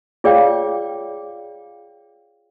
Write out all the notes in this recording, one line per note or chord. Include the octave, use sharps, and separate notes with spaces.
F4 G#4 C#5 D5 F5 G5